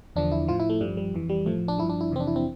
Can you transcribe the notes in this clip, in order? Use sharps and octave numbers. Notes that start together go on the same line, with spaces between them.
E2 D3 F3 D4
E4
A2 F3 F4
E4
A3
G2 F3 G3
G3
F2 E3
G3
A2 F3 A3
D4
G2 F3 E4
D4
E4
F2 C3 E3 C4
D4
E4
C4